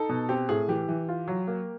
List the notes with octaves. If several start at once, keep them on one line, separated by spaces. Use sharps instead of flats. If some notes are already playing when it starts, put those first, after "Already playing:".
Already playing: D#4 A4
B2
C4 G4
A2 G#4
E3 G4
E3
F4
F#3
A#3